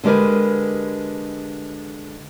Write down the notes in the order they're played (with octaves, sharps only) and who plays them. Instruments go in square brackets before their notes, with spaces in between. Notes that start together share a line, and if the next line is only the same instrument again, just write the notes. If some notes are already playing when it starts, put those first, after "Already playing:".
[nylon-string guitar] D3 G#3 G4 A#4 B4